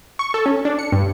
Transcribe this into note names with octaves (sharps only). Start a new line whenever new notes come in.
C#6
A4
C#4
D4
C#7
G2